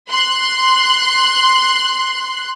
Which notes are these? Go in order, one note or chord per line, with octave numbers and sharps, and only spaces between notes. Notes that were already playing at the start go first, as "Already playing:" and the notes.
C6 F#6